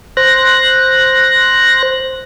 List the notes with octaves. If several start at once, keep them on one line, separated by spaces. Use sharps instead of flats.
C5 F#6 A#6